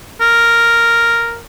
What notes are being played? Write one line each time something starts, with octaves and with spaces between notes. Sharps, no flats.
A#4